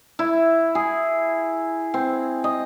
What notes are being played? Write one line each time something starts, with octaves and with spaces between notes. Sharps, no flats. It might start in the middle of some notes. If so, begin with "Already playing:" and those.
E4
G#4
C4
D#5